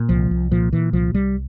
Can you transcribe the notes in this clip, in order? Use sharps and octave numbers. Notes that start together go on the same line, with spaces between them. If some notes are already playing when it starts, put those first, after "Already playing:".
Already playing: A#2
C2 F3
C2
A#2 F3
A#2 E3
C2 F3
C2 G3